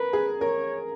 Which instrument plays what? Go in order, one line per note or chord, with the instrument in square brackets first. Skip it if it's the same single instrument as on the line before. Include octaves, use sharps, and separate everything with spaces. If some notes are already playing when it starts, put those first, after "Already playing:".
Already playing: [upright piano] A#4 [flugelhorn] B4
[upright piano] G#4
[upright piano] A#4 [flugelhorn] C#5